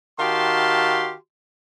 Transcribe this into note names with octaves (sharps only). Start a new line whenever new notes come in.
D#3 F#4 G4 F5 A5 C6